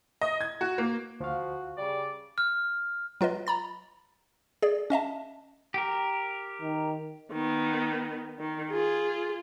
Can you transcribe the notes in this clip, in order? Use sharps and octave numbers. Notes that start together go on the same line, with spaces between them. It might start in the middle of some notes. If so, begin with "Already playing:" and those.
D#5
G#6
F#4
A#3
D2 F3 F#4 F5
C#3 G3 D5
F6
F#3 F4 B4 D#5
A#5 B5 A6
G#4 D5
C#4 D#5 E5 A5
G4 A#4
D#3
D#3 B3
D#3
F4 G#4